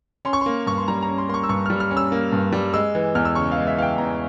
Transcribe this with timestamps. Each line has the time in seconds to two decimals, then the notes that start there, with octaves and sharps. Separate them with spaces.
0.25 C#4 C6
0.33 C#6
0.41 A#3 C6
0.66 G2 C#6
0.78 C6
0.88 G3 A#5
1.02 A#5
1.08 C#4
1.18 C6
1.28 A#3 C6
1.34 C#6
1.44 E6
1.49 G2 C#6
1.66 G3 F6
1.80 F6
1.91 C#4
1.97 E6
2.12 A#3
2.33 G2
2.52 G3
2.74 G#3 E6
2.95 E3
3.15 E2 F6
3.25 E6
3.35 C#3 C#6
3.52 F5
3.57 G#3
3.67 E5
3.77 E3 F5
3.82 G5
3.98 E2 A#5